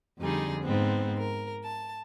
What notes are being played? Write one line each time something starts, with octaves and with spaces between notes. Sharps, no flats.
F2 D3 G3 D#4 G#4
G#2 B3 C4
A#4
A5